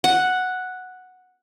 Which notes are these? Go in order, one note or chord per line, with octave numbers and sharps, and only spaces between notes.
F#5